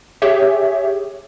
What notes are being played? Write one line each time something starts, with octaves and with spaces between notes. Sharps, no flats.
G4 G#4 C#5 E5